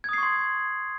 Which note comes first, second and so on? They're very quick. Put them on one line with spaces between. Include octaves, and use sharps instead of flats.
G#6 D#6 C7 C#6 C6